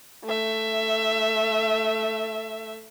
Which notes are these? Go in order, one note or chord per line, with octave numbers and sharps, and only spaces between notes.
A3 E5